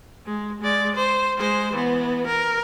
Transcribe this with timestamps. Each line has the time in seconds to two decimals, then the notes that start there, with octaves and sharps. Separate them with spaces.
0.26 G#3
0.62 G#3 D5
0.96 C5
1.37 G#3 C5
1.73 E3 B3
2.27 A#4